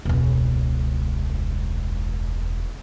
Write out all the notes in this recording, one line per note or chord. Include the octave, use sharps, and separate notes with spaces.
E1 C#2